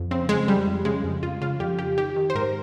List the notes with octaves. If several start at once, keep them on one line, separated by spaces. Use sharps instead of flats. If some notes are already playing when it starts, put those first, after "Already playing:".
Already playing: F2
C#3 C4
C#3 G#3
F2 G3
F2
C#3 G#3
F2
F2 F4
C#3 F4
F2 G4
F2 G4
D#3 G4
D#3
C5
G#2 A#4